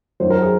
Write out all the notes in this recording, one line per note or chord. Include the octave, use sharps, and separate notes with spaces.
F#2 D#3 F#3 C5
A#4
G#4